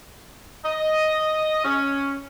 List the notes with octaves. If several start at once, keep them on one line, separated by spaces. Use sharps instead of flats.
D#5
C#4